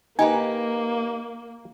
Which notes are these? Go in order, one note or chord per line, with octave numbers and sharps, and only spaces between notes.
A#3 D#4 G4 B4 G#5